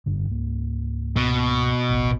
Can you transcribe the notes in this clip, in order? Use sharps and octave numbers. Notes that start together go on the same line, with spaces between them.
F1 G2 D3
C#2 G#2 A#3
B2
D1 A1